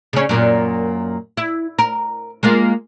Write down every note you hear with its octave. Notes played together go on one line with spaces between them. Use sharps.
C#3 C#4
F#2 A#2
E4
A#4
G#3 A#3 F4